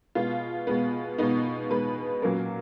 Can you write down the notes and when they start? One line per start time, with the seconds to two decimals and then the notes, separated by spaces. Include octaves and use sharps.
0.15 B2 G#3 B3 F4
0.67 B2 G#3 B3
1.18 B2 G#3 B3 D#4
1.70 B2 G#3 B3 B4
2.22 A#2 F#3 A#3 C#4 A#4